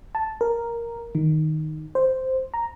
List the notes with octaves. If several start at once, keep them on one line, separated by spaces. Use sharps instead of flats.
A5
A#4
D#3
C5
A#5